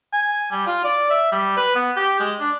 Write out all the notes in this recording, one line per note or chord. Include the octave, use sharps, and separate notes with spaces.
G#5
G3
F4
D5
E5
G3
B4
B3
G4
G#3
D4